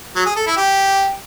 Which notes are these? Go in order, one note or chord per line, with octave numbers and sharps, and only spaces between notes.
F#3
G#4
A4
E4
G4